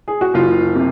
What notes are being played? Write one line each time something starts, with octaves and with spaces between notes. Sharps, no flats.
G#4
F#4
F#1 F4
C3